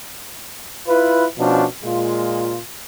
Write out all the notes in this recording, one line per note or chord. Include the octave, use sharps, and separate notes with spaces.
E4 F4 B4
B2 F3 C#4 D4 F#4
A#2 G#3 F4